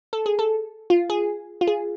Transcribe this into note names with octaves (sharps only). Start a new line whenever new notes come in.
A4
G#4
A4
F4
G#4
F4
G#4